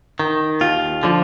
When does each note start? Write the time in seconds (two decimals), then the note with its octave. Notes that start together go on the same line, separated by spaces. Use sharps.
0.19 D#3
0.61 D#2 F4
1.03 D3 F3